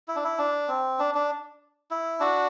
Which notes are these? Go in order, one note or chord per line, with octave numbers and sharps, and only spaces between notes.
E4
D4
E4
D4
C4
D4
D4
E4
D4 F#4